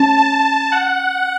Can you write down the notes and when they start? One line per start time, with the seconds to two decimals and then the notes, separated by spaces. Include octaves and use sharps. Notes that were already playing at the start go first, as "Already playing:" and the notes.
Already playing: C#4 A5
0.18 A5
0.72 F#5